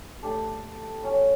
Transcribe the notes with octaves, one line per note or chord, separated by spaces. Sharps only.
A3 D4 G4 D5
F#3 C#4 F#4